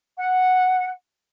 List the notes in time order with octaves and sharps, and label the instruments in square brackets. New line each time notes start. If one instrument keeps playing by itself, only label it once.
[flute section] F#5